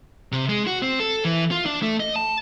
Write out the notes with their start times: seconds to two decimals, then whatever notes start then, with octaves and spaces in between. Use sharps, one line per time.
0.32 C3
0.49 G#3
0.67 F#4
0.82 C4
1.00 A4
1.25 E3
1.51 F4
1.66 D4
1.82 A3
2.00 D#5
2.16 A5